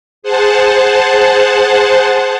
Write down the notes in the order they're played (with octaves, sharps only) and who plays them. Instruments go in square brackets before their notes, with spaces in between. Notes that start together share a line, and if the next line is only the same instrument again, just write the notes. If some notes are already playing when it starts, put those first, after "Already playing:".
[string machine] G#4 C5 F#5 A5